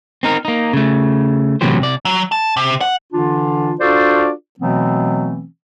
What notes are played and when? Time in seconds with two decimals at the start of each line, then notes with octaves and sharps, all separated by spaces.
0.23 C4 D#4 A#4
0.45 A#3 D#4
0.73 C#3 A3
1.61 A2 C3 E3 F#3 G4 C5
1.80 C3 D5
2.05 F#3
2.32 A5
2.57 C3
2.81 F#5
3.13 D3 E3 D4 F4
3.80 D4 F4 F#4 A4 C5 D5
4.60 B2 E3 F#3 A3 B3 C4